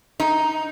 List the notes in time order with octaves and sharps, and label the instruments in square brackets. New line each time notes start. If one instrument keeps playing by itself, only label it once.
[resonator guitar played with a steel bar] D#4